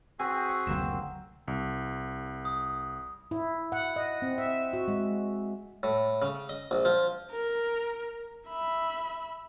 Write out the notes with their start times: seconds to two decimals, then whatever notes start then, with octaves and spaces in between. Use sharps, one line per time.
0.19 C4 F#4 G#4 G#5 B6
0.49 C#5
0.67 F#1 D2 C3 F#3 A#3 E7
1.48 C2
2.45 D#6
3.31 E4
3.72 F#5
3.96 D#5
4.22 C4
4.38 E5
4.73 F#4
4.88 G#3
5.83 A2
6.22 C#3
6.49 D#5
6.71 A#1
6.85 F3
7.31 A#4
8.48 E5 B5